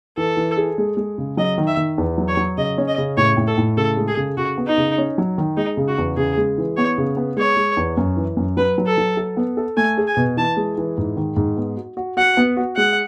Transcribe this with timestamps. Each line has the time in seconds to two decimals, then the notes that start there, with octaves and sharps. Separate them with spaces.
0.17 E3 A4
0.37 E3
0.57 G#4
0.78 G#3
0.97 G#3
1.18 C#3
1.37 F#3 D#5
1.58 D#3
1.67 E5
1.77 D#3
1.98 E2
2.18 F#3
2.28 C#5
2.37 F#3
2.58 C#3 D#5
2.78 C#4
2.88 D#5
2.98 C#3
3.17 A2 C#5
3.37 A2
3.47 A4
3.58 A2
3.77 C#3 A4
3.97 G#3
4.08 G#4
4.17 C#3
4.37 C#3 F#4
4.58 B3
4.67 D#4
4.78 C#3
4.98 C#4
5.18 F#3
5.38 D#3
5.57 G#3 D#4
5.77 C#3
5.88 F#4
5.98 E2
6.17 C#3 G#4
6.37 G#3
6.58 E3
6.77 B3 C#5
6.98 C#3
7.17 B3
7.37 G#3 C#5
7.57 G#3
7.77 E2
7.97 F#2
8.17 E3
8.37 F#2
8.57 F#3 B4
8.78 F#3
8.87 A4
8.98 F#3
9.17 A4
9.37 B3
9.57 A4
9.77 A3 G#5
9.98 G#4
10.07 G#5
10.17 B2
10.37 E3 A5
10.57 G#3
10.78 E3
10.98 G#2
11.17 D#3
11.37 G#2
11.57 B3
11.77 F#4
11.97 F#4
12.17 F#4 F#5
12.37 B3
12.57 F#4
12.77 G#3 F#5